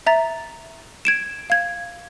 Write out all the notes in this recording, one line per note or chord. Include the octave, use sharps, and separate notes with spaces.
E5 A#5 A6
G#6 D7 E7
F5 G#6